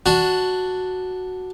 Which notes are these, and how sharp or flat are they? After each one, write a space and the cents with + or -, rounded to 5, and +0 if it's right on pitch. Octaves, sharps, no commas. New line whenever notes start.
D4 +0 F#4 +0